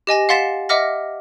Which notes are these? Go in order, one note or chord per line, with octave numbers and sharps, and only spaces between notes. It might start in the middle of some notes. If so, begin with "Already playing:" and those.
G4 D#5 G#5 A#6
F5 F#5 C6 A6 B6 E7
D#5 E5 F#5 D6 F6 A#6